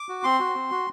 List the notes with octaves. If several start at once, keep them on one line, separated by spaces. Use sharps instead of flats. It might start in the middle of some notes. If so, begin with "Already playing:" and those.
Already playing: D6
F#4
C4 C6
F#4
C4
F#4